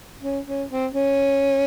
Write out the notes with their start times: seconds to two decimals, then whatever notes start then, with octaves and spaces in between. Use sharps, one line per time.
0.22 C#4
0.47 C#4
0.70 C4
0.94 C#4